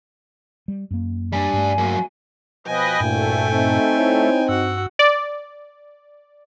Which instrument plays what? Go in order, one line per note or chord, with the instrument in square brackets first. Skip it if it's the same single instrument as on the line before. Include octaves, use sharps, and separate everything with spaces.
[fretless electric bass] G3
F#2 A#3
[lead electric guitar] G3 D4 [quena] G#5
[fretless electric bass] G2 A3
[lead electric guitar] F#3 A#3
[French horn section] B2 F3 [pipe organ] B4 D#5 [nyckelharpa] G5 G#5
[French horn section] D2 A#3 E4 [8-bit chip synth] G2 A#2 [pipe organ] A3
[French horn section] C4 D#4
[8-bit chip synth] E4 C#5
[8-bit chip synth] G2 E6 [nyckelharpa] F#4 F#5
[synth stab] D5